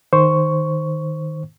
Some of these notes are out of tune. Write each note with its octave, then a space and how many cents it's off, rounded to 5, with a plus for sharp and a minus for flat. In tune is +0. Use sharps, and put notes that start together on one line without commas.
D#3 +0 C5 +0 C#6 +5